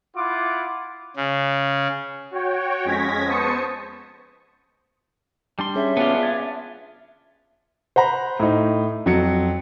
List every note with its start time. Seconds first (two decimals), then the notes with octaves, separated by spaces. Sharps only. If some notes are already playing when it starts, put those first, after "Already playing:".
0.17 E4 F4 F#5 D6
1.16 C#3
2.31 F#4 C#5 G5
2.84 F2 G#3 C#4 G#6 A#6 B6
3.27 B3 C5 A5 C#6 D#6 C#7
5.59 G3 D4 C6
5.76 C#4 G#4 E5
5.97 B3 D4 F4
6.23 G#5 A5
7.96 C5 F#5 A#5 B5
8.40 A2 D#4
9.06 F2 F#3 C#7